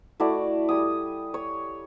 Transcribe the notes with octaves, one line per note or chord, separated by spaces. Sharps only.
A3 E4 F#4 D5
G3 G#5 D#6
C#5